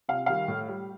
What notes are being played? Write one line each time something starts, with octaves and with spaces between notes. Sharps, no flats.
C3 F5
D#3 G3 F5
A2
G3